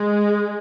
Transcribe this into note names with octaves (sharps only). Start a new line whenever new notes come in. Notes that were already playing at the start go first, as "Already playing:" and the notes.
Already playing: G#3